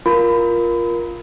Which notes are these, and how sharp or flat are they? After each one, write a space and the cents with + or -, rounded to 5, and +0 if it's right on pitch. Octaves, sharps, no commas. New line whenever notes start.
F4 +0 A#4 +15 B5 +30